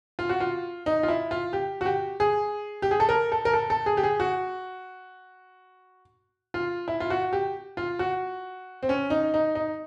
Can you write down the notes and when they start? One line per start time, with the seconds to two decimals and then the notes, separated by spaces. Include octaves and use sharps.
0.19 F4
0.29 F#4
0.40 F4
0.86 D#4
1.03 F4
1.08 E4
1.31 F4
1.53 G4
1.81 F#4
1.86 G4
2.20 G#4
2.82 G4
2.91 G#4
3.00 A4
3.09 A#4
3.32 A4
3.45 A#4
3.53 A4
3.70 A4
3.86 G#4
3.97 G4
4.03 G#4
4.20 F#4
6.54 F4
6.88 E4
7.00 F4
7.10 F#4
7.33 G4
7.77 F4
7.99 F#4
8.83 C4
8.89 C#4
9.10 D#4
9.34 D#4
9.55 D#4